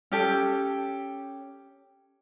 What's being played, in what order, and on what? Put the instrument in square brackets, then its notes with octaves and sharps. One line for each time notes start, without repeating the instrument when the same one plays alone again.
[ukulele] C#4 G4 A4